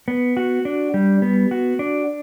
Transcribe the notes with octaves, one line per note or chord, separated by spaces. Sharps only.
B3
F#4
D4
G3
B3
F#4
D4